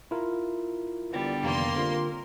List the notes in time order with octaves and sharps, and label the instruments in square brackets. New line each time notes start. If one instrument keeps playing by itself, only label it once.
[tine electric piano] E4 F4 A#4
[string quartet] D3 G3 B3
[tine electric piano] F2 C3 D#3 [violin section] A#3 C6
[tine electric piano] D3 C4 F4 [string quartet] A#4